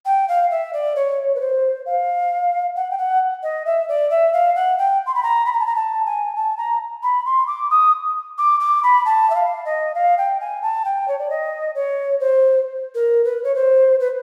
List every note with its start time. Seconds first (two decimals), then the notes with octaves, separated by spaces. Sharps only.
0.06 G5
0.29 F5
0.51 E5
0.73 D5
0.96 C#5
1.35 B4
1.41 C5
1.86 F5
2.76 F#5
2.91 G5
2.98 F#5
3.43 D#5
3.66 E5
3.89 D5
4.10 E5
4.33 F5
4.56 F#5
4.78 G5
5.07 C6
5.15 B5
5.23 A#5
5.46 B5
5.53 A#5
5.60 A5
5.67 A#5
5.76 A5
6.06 G#5
6.36 A5
6.58 A#5
7.03 B5
7.25 C6
7.47 D6
7.71 D#6
8.38 D6
8.60 D6
8.83 B5
9.05 A5
9.30 E5
9.35 F5
9.65 D#5
9.95 F5
10.18 G5
10.41 G#5
10.62 A5
10.85 G5
11.08 C#5
11.19 D5
11.30 D#5
11.75 C#5
12.20 C5
12.95 A#4
13.25 B4
13.44 C#5
13.55 C5
14.00 B4